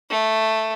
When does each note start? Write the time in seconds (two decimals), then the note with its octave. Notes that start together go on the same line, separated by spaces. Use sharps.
0.10 A3